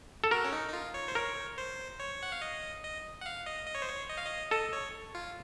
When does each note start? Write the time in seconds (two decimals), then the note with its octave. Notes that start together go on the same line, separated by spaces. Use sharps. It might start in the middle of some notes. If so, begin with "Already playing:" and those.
0.24 A4
0.31 F#4 A#4
0.45 C#4
0.52 D#4
0.68 D#4
0.73 F4
0.94 C#5
1.08 C5
1.15 A#4 C#5
1.58 C5
2.00 C#5
2.23 F#5
2.32 F5
2.42 D#5
2.83 D#5
3.21 F#5
3.26 F5
3.46 D#5
3.67 D#5
3.75 C#5
3.82 C5
3.89 C#5
4.09 D#5
4.17 F5
4.25 D#5
4.51 A4 D#5
4.73 C#5
5.15 F4